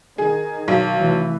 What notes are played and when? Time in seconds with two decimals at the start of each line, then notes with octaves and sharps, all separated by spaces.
0.18 D#3 G#4
0.68 B1
1.00 F1 E3